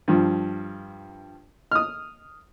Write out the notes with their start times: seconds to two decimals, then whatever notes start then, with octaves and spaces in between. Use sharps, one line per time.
0.08 G2 F3
1.72 D#6 F6